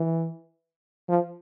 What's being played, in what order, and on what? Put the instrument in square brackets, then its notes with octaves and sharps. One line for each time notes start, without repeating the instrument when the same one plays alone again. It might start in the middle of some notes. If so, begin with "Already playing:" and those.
Already playing: [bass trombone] E3
F3